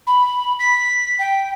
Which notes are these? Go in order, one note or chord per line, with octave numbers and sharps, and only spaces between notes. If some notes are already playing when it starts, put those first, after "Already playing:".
B5
B6
G5